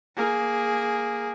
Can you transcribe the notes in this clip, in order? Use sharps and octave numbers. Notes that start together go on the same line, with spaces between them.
A#3 G#4